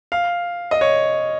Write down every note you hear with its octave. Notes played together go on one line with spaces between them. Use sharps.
F5
D#5
C#5